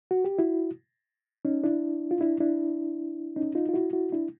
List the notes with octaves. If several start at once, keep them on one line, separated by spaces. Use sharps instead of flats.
F#4
G4
E4 F#4
C#4 D#4
D4 E4
F4
D4 E4
D4 E4
C#4 D#4
D#4 F4
F4
E4 F#4
E4 F#4
D4 E4